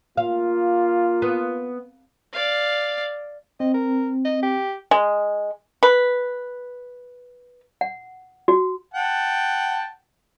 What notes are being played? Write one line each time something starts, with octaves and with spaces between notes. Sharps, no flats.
A#3 F4 F5
B3
D5 F5
C4 D#5
A#4
D#5
G4
G#3
B4
F#5
F#4
F#5 G5 A5